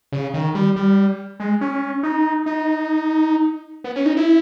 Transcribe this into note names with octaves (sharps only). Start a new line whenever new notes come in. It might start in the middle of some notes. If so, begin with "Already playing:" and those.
C#3
D#3
G3
G3
G#3
C#4
D#4
D#4
B3
C#4
D#4
E4